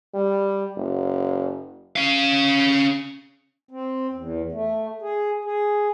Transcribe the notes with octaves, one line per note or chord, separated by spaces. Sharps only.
G3
F#1
C#4 F5
C4
E2
A3
G#4
G#4